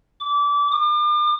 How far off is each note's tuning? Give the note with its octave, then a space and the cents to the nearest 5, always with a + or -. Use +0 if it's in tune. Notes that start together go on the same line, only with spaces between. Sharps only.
D6 -25
D6 +40